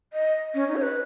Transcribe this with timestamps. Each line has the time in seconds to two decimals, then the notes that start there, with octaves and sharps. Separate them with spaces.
0.13 D#5
0.54 C#4
0.69 D#4
0.76 C#5
0.82 B4